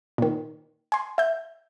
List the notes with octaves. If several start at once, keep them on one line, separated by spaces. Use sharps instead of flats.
A#2 D#3
G#5 C6
E5 G6